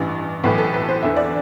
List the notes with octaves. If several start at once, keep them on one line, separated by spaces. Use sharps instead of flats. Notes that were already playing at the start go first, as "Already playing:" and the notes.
Already playing: A1 G2 E3
B1 A2 E3 B4
A4
B4
C5
E2 D3 E5
D5